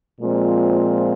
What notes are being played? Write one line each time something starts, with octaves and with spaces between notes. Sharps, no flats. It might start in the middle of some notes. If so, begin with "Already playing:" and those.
A#2 F3 G#3 C4 F4